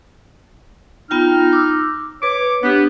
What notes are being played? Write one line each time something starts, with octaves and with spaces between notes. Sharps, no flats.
B3 D#4 F4 G5 F6
D6 E6
B4 C#5 D6
B3 D4 G4